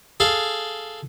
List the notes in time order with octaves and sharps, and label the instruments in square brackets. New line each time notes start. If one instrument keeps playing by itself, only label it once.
[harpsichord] G#4 A4 F5